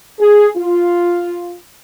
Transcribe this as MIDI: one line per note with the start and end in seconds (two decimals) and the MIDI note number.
0.20 0.48 68
0.56 1.53 65